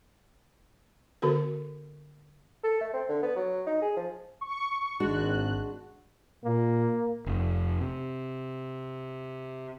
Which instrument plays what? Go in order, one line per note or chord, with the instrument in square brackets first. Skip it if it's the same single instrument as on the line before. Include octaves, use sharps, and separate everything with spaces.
[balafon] D3 B3 F#4 A4 A#4
[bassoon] A4
A3
C4
D3
B3
F#3
D#4
G#4
F3
[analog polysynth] C#6
[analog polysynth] G#1 F#6 [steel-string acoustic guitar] G#3 D4 F#4
[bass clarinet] A#2 [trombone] A#3
[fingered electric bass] F1
C3